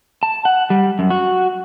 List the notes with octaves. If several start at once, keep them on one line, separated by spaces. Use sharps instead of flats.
A5
F#5
G3
F#2
F#4